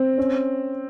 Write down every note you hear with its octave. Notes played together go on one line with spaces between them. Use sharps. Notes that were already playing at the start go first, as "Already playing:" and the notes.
Already playing: C4
C#4